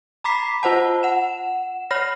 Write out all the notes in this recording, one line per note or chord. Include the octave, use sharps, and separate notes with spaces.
A#5 B5 D6 B6 C7
F4 C5 F#5 A5
F#5 E7
C#5 B5 F6 A#6